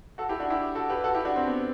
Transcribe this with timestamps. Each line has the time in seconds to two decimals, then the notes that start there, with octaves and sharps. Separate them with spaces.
0.18 F#4 A4
0.29 E4 G4
0.40 D4 F#4
0.50 E4 G4
0.75 F#4 A4
0.90 G4 B4
1.04 F#4 A4
1.15 E4 G4
1.25 D4 F#4
1.36 C4
1.47 B3